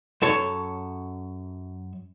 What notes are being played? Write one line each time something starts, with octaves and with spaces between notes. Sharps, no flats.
F#2 A4 C#5